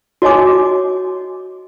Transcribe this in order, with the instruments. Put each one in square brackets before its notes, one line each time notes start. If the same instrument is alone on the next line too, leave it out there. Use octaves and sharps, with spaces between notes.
[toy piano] F#4 C#5 D#5 G#5 D6